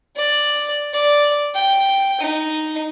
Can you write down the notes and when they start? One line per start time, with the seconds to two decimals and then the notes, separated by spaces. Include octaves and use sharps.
0.16 D5
0.93 D5
1.55 G5
2.21 D#4